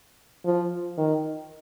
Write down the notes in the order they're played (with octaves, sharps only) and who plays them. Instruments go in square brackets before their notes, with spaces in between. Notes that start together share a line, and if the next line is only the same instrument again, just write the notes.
[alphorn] F3
D#3